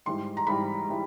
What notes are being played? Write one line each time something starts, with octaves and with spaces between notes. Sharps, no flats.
G#2 E3 G3 C6
A#5
G#2 E3 G3 B5
E3 G3